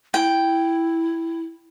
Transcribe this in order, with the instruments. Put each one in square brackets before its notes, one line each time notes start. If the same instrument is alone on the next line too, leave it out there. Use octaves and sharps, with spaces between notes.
[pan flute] E4 [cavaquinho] G5